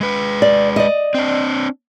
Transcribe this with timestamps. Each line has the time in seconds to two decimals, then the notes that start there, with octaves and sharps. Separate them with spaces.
0.01 G#3 B4
0.42 D5
0.76 D5 D#5
1.14 C4 D4